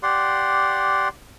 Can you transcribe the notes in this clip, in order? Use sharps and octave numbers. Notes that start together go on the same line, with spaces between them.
G4 D5 F#5 C6